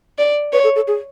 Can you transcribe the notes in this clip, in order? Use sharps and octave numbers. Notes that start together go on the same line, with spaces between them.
D5
B4 C#5
A4
A4
G#4